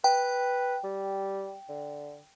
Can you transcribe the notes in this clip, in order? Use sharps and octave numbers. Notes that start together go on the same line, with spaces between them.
B4 G5
G3
D3